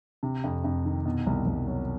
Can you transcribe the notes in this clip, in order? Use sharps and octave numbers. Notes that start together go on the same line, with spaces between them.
C3
F2
F2
D#3
B2
C2
C2
F#3